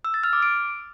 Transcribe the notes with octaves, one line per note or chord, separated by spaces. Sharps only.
E6
A6
F6
D6
D7